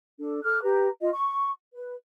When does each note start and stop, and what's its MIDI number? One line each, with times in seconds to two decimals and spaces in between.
0.19 0.40 62
0.19 0.40 69
0.44 0.59 69
0.44 0.59 86
0.44 0.59 89
0.44 0.59 90
0.62 0.88 67
0.62 0.88 71
0.62 0.88 82
1.01 1.09 65
1.01 1.09 75
1.13 1.50 85
1.74 1.94 71